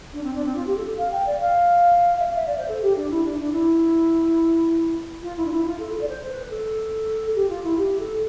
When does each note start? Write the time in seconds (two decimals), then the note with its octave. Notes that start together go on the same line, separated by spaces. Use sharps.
0.13 D4
0.23 C4
0.34 D4
0.45 C4
0.55 F4
0.66 G4
0.76 A4
0.98 F5
1.12 G5
1.26 D5
1.40 F5
2.19 E5
2.25 F5
2.36 E5
2.46 D5
2.57 C5
2.68 A4
2.82 G4
2.96 D4
3.10 E4
3.24 D4
3.39 D4
3.53 E4
5.22 F4
5.37 E4
5.45 D4
5.51 E4
5.65 F4
5.79 A4
5.93 A4
6.01 D5
6.08 C5
6.29 B4
6.40 B4
6.50 A4
7.35 G4
7.49 F4
7.63 E4
7.78 G4
7.99 A4